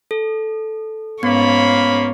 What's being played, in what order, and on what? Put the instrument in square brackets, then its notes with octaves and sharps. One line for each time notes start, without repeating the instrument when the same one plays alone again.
[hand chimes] A4
[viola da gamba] G#2 C#4 C#5 [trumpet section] A#3 F4 B5 [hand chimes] B3